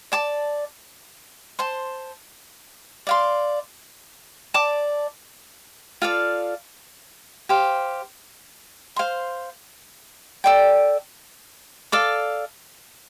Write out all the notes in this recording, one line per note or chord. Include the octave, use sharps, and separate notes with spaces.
D5 A5 D6
C5 A5 C6
D5 F5 C6
D5 A5 D6
F4 A4 D5 F5
G4 C5 F5
C5 F5 C6
A4 D5 G5
A4 D5 F5 D6